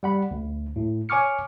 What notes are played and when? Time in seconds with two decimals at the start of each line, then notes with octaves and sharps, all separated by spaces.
0.03 G3 F#5 B5
0.31 D2
0.76 A2
1.09 C#5 G#5 C#6 D6 F6 C#7